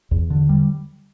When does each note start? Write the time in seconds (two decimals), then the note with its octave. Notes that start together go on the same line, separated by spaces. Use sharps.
0.11 E2
0.30 D3
0.49 G3